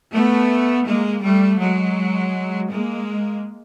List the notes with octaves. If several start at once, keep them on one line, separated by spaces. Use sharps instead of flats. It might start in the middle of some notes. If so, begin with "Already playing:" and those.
A3 B3
G#3 A#3
G3 A3
F#3 G#3
G#3 A#3